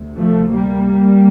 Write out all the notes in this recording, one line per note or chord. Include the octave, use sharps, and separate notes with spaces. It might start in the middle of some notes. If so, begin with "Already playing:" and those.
Already playing: D2 C3
F3 A3
G3 A#3